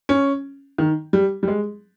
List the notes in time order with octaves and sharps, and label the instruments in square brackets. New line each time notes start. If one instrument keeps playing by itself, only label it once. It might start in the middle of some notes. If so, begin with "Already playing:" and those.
[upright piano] C#4
D#3
G3
G3
G#3